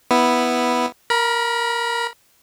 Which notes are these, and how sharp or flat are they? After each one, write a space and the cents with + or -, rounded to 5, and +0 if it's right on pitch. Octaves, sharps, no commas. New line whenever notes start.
B3 +0 E4 -5
A#4 +0 B5 -35